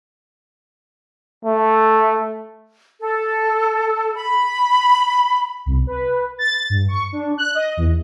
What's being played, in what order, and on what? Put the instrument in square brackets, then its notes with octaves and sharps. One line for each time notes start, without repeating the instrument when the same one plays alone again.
[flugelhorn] A3
[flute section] A4
B5
[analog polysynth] C2
B4
A6
G2
C#6
D4
F#6
D#5
E2